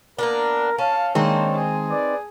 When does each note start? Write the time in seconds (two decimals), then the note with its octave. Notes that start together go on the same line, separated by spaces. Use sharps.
0.19 A#3 B3 D4 A#4
0.78 C#4 F5 A5
1.15 D#3 G#3 A#3 C4 D4 D#4 C5 C#5
1.55 G#4
1.89 B4 D5